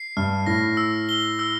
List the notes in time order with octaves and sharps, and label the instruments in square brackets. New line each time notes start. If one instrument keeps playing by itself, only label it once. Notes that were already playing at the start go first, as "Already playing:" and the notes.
Already playing: [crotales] C7
[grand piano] G2 [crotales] F6
[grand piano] A2 [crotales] A#6
[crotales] E6
G7
E6